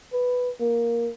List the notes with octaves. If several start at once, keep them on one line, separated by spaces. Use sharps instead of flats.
B4
A#3